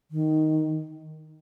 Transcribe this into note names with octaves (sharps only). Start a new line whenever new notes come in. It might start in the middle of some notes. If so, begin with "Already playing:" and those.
D#3